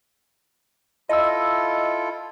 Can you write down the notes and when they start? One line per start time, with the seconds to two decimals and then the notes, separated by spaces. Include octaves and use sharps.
1.09 E4 F4 A4 D#5 E6